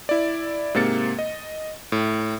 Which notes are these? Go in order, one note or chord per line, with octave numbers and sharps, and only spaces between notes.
E4 D5
G#2 C3 A#3 A6 C#7
D#5
A2